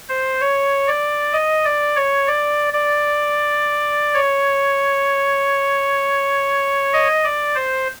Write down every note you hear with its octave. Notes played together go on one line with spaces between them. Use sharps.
C5
C#5
D5
D#5
D5
C#5
D5
D5
C#5
D#5
D5
C5